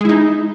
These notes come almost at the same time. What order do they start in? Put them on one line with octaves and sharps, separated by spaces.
G#3 E4 D#4